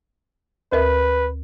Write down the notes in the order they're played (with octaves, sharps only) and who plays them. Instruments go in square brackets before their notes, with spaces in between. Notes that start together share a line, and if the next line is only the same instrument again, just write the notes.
[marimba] D2 A#4 E5 [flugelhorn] B4